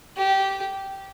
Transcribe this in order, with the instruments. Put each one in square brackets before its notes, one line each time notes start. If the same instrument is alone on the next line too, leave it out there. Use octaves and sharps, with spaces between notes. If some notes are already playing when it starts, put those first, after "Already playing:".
[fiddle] G4